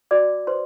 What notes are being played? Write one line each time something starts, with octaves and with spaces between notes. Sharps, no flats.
F#4 D5 D6
B4 C5 C6